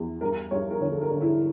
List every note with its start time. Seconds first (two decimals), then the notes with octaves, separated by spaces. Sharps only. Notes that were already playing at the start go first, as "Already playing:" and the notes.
Already playing: E2
0.21 G2 A#4
0.51 G2 C#5
0.71 A#4
0.80 D3 C#5
0.92 A4
1.01 A#4
1.11 D3
1.21 E4